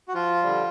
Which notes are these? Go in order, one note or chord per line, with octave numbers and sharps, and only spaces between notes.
F#4
F3 F4
D3 G3